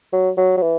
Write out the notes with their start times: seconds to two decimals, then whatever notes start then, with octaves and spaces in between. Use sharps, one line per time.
0.13 F#3
0.38 F#3
0.57 F#3
0.62 E3